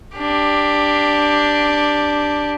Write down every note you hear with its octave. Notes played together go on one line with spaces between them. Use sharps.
D4 G4